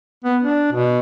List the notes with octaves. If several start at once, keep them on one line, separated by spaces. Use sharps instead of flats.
B3
D4
B2